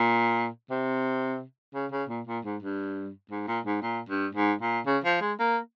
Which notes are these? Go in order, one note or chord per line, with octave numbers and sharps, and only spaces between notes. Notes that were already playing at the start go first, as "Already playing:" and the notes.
Already playing: A#2
C3
C#3
C#3
A#2
A#2
G#2
G2
G#2
A#2
G#2
A#2
G2
G#2
A#2
C#3
F3
G#3
A#3